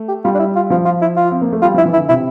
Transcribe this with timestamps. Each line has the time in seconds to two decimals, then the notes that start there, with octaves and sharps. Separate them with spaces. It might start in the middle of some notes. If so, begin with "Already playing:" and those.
Already playing: A3
0.08 G4
0.24 G3 F4
0.35 D4
0.40 E4
0.56 F4
0.70 F3 F4
0.85 F4
1.02 E4
1.16 F4
1.31 C4
1.42 A#3
1.52 A3
1.62 G3 F4
1.74 F3 E4
1.85 E3
1.93 E4
1.97 D3
2.09 C3 E4